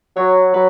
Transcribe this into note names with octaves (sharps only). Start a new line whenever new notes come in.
F#3 C#5
F#3 B4